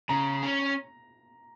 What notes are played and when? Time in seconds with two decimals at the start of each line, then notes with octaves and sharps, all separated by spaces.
0.09 C#3 A#5
0.43 C#4